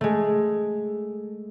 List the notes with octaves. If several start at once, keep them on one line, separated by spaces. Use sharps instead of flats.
G#3 A3